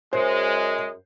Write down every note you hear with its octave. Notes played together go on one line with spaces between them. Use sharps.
F#2 G#3 C5